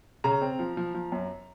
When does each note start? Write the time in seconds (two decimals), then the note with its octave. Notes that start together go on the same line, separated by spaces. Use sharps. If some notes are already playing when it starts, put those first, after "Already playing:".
0.24 C#3 A#5
0.42 C4
0.59 F3
0.77 F3
0.94 F3
1.12 F#2